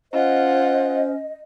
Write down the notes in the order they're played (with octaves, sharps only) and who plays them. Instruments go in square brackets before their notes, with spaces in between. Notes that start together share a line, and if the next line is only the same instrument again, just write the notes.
[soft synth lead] C#4 [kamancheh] F4 F#5 [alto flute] C5 [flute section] D#5